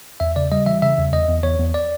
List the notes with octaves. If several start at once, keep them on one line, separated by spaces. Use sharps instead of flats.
E2 E5
C#3 D5
G3 D#5
E3 E5
C#3 E5
E2
E2 D#5
E2
E2 C#5
E2
D5